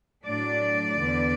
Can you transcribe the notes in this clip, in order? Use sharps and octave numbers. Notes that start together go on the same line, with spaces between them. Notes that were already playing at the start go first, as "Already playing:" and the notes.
A2 F#3 D4 D5
E2 D3 B3 D4